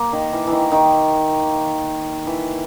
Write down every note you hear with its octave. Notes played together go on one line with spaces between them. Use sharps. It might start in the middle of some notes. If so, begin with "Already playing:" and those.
Already playing: A#3
D#3
E3
D#3 E3
D#3
E3